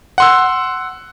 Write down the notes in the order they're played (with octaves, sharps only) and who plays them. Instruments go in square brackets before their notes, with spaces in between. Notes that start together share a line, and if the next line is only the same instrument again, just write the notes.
[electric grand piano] F#5 C6 E6